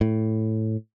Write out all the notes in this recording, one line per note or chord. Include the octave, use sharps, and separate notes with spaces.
A2